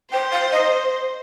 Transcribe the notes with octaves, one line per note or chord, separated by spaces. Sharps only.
C5 G5
F5
D#5